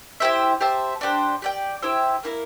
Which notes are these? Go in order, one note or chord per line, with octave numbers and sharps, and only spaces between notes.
E4 G4 C5 E5
G4 C5 E5 A5
D4 G4 C5
G4 D5 G5
E4 G4 C5 E5
A#3 E4 A#4